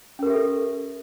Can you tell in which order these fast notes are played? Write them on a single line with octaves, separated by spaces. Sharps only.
C#4 A#4 G4 E5 A4